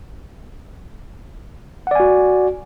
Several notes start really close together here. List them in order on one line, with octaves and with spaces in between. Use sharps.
F#5 D5 G#5 F#4